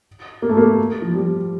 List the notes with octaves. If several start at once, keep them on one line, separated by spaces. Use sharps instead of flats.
A#3
A3
A#3
F3
G3